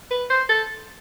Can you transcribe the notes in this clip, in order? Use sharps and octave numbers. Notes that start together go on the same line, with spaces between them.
B4
C5
A4